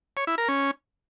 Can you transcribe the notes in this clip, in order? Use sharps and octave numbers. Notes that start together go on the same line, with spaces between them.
C#5
E4
A#4
C#4